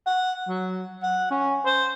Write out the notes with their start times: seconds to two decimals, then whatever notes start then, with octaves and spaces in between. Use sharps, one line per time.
0.06 F#5
0.48 F#3
1.03 F#5
1.31 C#4
1.65 C5